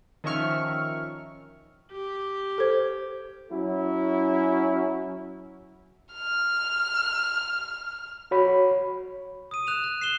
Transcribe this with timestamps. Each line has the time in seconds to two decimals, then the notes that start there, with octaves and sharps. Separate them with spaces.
0.24 D#3 F3 C#4 E5 C#6 F6
1.91 G4
2.58 A4 C5
3.51 F#3 C#4 E4
6.13 F6
8.31 F#4 C#5 B5
9.51 D#6 D#7
9.67 F#6 E7 F7
9.84 F#6
10.01 C7 E7 G7